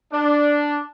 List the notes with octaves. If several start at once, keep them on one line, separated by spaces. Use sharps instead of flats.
D4